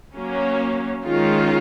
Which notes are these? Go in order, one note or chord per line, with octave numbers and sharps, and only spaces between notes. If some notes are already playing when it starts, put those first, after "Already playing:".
F#3 A#3 C#4
D#3 G#3 C#4 F4